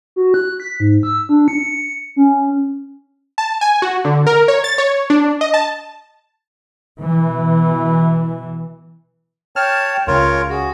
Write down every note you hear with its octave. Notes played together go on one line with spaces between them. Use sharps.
F#4
F#6
B6
G#2
E6
D4
C#7
C#4
A5
G#5
F#4
D3
A#4
C#5
A6
C#5
D4
D#5
A5
B2 E3
C#5 G5 A5 F6
C#2 C#3 F4 A#4 C#5 C6
F#4 G#4